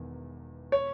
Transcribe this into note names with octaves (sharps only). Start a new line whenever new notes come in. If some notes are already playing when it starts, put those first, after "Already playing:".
Already playing: E1 E2 D#3
C#5